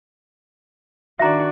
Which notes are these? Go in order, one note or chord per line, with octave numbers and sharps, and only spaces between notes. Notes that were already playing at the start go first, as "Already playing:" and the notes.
D#3 D4 F#4 D5 E5 A#5